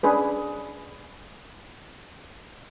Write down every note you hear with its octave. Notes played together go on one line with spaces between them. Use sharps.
C#4 D4 G#4 B4